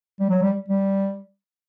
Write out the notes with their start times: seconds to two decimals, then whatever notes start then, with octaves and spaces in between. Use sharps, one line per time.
0.20 G3
0.30 F#3
0.42 G3
0.68 G3